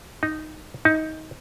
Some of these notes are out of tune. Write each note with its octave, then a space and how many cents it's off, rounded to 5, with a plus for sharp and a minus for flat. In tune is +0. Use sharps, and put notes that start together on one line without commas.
D#4 -5
D#4 +20